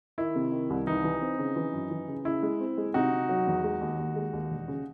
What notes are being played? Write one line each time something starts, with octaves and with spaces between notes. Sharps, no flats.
D#3 E4
C3
D#3
C2
E3 D#4
E3
C4
C#3
E3
F#2
E3
C#3
C#3 E4
G#3
C4
G#3
C3 D#4 F#4
C3
F#3
E2
G#3
D#2
D#2
G#3
D#2
E1
C#3